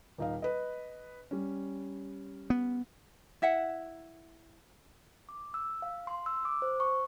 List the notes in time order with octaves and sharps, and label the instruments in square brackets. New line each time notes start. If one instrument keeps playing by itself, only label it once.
[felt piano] D#1 D#4 F5
B4 D#5
G3 C#4
[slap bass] B3
[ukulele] E4 E5 F#5
[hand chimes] D6
E6
F5
C6
E6
D6
C5
C#6